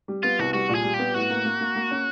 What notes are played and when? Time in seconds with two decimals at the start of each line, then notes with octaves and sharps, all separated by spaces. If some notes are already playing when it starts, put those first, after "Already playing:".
0.08 G3
0.23 B3 F4
0.39 C2 F#4
0.53 G3 F#4
0.69 A#2
0.75 G#4
0.84 G3
0.94 G4
0.99 B3
1.14 A2 F#4
1.30 A#3
1.45 A#3
1.61 A#3
1.76 A#3
1.91 C#4